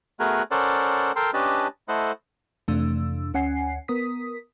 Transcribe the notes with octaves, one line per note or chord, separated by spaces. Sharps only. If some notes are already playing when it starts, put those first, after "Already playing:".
A3 B3 F#4 G#4 A#4 B4
C#4 A4 A#4 C5 D5 F#5
A4 A#4 G5 C6
C#4 D4 G4 B4 D#5 A5
A3 E4 A4 C5 D#5 F#5
F2 C3 E3 A3 D4 E6
D2 C#4 F#5 G#5 C7
B3 A#4 D#6 B6